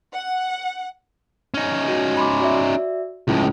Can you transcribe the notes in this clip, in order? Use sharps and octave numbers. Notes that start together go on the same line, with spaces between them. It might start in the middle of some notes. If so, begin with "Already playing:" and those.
F#5
C#4 D#4
F#4
B5 C6 D6
F#4 D5 E5
C#2 A2 C#4 E4 F4